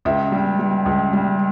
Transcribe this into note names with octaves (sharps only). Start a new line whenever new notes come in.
C#2 E5
G3
G3
C#2
G3